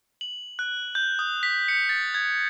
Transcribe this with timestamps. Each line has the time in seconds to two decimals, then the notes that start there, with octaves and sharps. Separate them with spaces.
0.21 F#7
0.59 F#6
0.95 G6
1.19 D#6
1.43 B6
1.68 C#7
1.89 A6
2.14 G#6